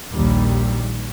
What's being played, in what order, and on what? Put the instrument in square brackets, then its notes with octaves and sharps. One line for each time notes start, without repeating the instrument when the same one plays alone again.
[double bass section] A#1 D#2 G3